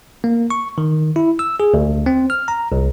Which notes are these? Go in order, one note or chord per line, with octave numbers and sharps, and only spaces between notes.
A#3
C#6
D#3
E4
E6
G#4
D2
C4
F6
A#5
C2